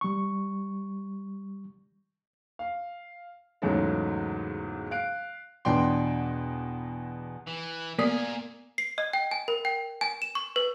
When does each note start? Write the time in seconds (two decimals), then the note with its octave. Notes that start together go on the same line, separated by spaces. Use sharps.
0.01 G3 C#6
2.59 F5
3.62 E2 G#2 C#3 F#3 G#3 A3
4.91 F5 F#6 D7
5.65 E2 B2 D4 G5 C6
7.47 E3
7.99 A#2 A#3 B3 D5 G#5 D#6
8.78 C7
8.98 D#5
9.13 G5
9.31 G#5
9.48 A#4
9.65 G5
10.01 G#5
10.22 E7
10.35 C#6
10.56 B4